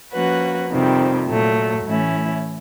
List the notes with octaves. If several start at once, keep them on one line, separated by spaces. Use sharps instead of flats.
F3 A#3 C#4 F#4 B4
F2 C3 D#3 G3 C4
A#2 F#3 A3
A2 E3 A3 C#4 E4